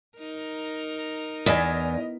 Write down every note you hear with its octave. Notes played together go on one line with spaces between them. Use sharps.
D#4 A#4
E2 D5 D#5 G#5 B6